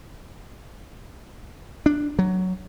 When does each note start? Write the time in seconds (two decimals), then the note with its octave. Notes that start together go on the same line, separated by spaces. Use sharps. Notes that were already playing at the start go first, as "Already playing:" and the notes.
1.86 D4
2.19 F#3